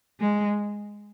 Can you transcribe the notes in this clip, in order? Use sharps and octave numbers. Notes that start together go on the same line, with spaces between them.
G#3